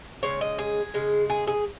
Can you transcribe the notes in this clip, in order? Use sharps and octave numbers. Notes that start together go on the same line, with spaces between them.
C#3 G#3 C#5
D#5
G#4
C#3 G#3
G#4
G#4